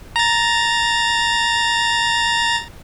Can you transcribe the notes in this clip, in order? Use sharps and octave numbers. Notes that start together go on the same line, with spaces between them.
A#5 A6